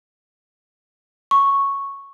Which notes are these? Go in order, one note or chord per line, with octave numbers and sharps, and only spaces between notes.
C#6